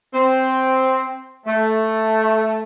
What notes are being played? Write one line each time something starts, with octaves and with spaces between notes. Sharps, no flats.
C4
A3